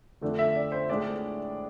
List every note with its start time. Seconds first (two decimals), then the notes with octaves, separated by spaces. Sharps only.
0.22 F2 D3 A3 D4
0.39 E5
0.55 D5
0.72 C5
0.90 A2 G#3 D4 D5